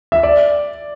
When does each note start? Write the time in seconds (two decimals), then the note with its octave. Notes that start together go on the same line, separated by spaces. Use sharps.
0.12 E5
0.23 D5